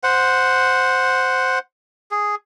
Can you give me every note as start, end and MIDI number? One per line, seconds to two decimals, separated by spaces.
0.03 1.59 72
0.03 1.59 78
2.11 2.35 68